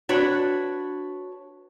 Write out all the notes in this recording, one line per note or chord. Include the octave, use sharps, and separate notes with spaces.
D4 F#4 B4 C#5